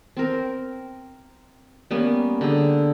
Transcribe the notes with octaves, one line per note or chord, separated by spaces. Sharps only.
C4 A#4
G3 A#3 B3 C#4
D3 G4 G#4